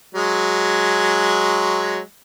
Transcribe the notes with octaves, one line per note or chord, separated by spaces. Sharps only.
F#3 G#3